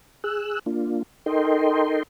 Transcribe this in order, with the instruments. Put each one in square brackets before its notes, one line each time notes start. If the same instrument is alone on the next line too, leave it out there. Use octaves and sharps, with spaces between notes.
[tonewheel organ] G#4 E6 F#6
A#3 D4 F4
D#4 A4 A#4 D#5 G5 C6